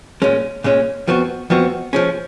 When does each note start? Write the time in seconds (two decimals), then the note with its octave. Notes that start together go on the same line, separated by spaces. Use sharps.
0.22 A#2 G#3 C#4
0.64 A#2 G#3 C#4
1.07 F2 F3 B3 F#4
1.50 F2 F3 B3 F#4
1.93 F3 G#3 C#4